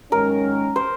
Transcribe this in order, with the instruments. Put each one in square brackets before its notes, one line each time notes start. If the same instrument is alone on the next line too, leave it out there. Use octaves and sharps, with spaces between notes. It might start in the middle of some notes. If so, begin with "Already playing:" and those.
[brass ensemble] G#2 D#3 F#3 C#4 [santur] A#4
[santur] C5